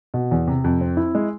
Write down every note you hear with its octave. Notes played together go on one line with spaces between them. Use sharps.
B2
E2
C3
F2
C4
E4
G#3